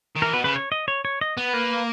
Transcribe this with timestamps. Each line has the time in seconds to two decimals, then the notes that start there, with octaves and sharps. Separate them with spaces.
0.16 D#3
0.22 E3 A#4
0.33 B2 B4
0.44 C#3 B4
0.56 C#5
0.72 D#5
0.88 C#5
1.05 C#5
1.21 D#5
1.37 B3 B4
1.53 A#3